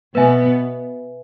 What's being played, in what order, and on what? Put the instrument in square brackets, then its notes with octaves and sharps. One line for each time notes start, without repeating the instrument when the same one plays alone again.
[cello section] B2 B3 [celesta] B4 E5 G#5